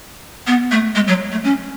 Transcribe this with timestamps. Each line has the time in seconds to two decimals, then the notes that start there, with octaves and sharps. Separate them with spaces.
0.47 B3
0.71 A3
0.95 G#3
1.08 F#3
1.32 A3
1.44 C#4